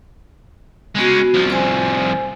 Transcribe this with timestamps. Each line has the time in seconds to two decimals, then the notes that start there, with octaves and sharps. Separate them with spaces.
0.97 G#3 B3 C#4 F#4
1.34 C2 F3
1.50 C5 G#5